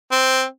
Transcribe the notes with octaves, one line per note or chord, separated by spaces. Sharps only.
C4